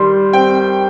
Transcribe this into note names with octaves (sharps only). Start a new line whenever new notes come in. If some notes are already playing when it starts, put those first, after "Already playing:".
Already playing: D#3 G3 C6
C4 G5